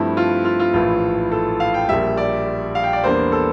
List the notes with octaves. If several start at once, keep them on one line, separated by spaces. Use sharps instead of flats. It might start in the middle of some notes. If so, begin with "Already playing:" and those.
Already playing: G2 F3 A3 C4 E4
F4
F4
F4
A#1 A2 E3 F4
A4
F5
G5
A#1 A#2 G3 E5
D5
F5
G5
D5
E2 E3 G3 A#3 D4 C5
A4